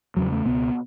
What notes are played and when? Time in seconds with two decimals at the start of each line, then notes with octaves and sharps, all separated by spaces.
0.17 E2 C#3 F#3
0.32 A3
0.45 C#2 B2 B3